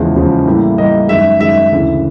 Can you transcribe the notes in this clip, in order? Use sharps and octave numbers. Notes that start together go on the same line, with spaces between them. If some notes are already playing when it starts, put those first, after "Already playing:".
Already playing: E2 C#3 F3 G#3
E2 C#3 F3 G#3
A2 E3 G3 A#3
A2 E3 G3 A#3 D#5
F#2 D#3 G#3 E5
F#2 D#3 G#3 E5
D2 C#3 E3